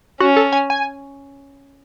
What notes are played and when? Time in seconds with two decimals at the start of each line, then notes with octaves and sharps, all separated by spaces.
0.20 C#4 F#4
0.36 A4
0.52 G#5
0.70 G#5